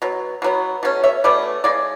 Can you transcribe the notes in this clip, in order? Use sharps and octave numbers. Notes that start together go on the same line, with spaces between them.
B2 F#3
B2 F#3 B3
B2 A3 C#4
C#5 E5
B2 A3 C#4 B4 D5
C#3 G#3 D5